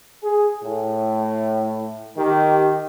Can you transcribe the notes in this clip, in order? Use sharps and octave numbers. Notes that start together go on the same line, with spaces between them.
G#4
A2
D#3 G4